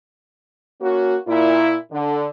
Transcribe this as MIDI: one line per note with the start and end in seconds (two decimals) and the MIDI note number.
0.81 1.16 58
0.81 1.16 61
0.81 1.16 66
1.28 1.76 46
1.28 1.76 64
1.92 2.28 50